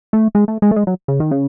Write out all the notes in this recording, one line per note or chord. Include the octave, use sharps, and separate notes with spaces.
A3
G#3
A3
G#3
A3
G#3
F#3
C#3
D#3
C#3